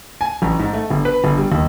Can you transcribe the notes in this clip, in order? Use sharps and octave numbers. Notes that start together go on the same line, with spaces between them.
G#5
A1
G#2
A3
G1
B4
G1
G3
D#2